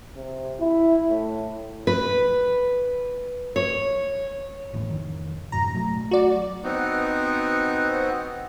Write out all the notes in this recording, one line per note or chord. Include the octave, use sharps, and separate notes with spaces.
C3
E4
A2
B4
C#5
G#1 E2 A2
F1 D#3
A1 F#2 B2 A#5
F#3 A3
F#4 D5
B3 C4 D#4 F#4